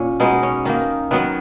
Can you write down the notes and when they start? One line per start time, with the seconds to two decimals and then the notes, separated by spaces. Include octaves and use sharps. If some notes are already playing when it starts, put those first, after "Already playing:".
Already playing: A#2 C#4
0.20 B2 G#3 B3 D#4
0.43 C#4
0.65 D#3 A#3 D#4
1.11 D#3 F#3 B3 B4